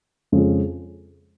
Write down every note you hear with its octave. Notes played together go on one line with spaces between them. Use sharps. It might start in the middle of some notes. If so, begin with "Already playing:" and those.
F2 C#3 G#3 C#4 F4